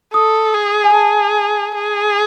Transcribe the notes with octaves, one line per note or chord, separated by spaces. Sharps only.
A4 D#6
G#4
G#5
G#4 A5
G#4